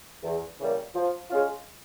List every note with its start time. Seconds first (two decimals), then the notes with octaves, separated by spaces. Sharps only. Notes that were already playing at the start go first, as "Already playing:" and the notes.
0.23 E2
0.59 C#3 E3 G3 A#3
0.95 F3
1.30 G#3 C#4 F4